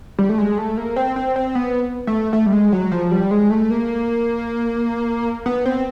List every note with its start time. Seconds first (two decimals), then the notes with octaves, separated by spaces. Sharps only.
0.19 G3
0.29 A3
0.38 G#3
0.58 A3
0.77 A#3
0.96 C4
1.16 C4
1.36 C4
1.55 B3
2.07 A3
2.33 A3
2.46 G3
2.53 G#3
2.73 F#3
2.92 F3
3.11 G3
3.31 G#3
3.50 A3
3.70 A#3
5.46 B3
5.65 C4